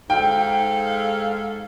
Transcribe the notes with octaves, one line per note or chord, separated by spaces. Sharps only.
G#2 A4 F5 G5